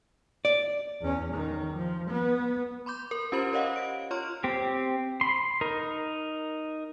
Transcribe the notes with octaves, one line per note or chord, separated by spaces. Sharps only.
D5
E2 C#4
D#3
F3
B3
B5 C6 D6 G6
A#4
C#4 F4 G4 C5 B5 F#7
A#4 C#5 D#5 F5 F#5
D7
F4 C#5 C6 C#6 F6
C4 G4
B5 C6
D#4 A#4